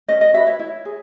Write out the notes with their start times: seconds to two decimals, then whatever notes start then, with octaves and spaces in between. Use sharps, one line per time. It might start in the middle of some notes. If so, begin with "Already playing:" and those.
0.08 C#4 D#5
0.21 D#5
0.34 F#4 B4 E5
0.47 C#5
0.59 E4
0.85 G#4